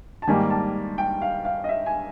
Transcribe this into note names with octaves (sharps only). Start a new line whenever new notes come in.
A5
G#2 D#3 G3 A#3 G#5
A5
G5
F5
F5
D#5
E5
G#5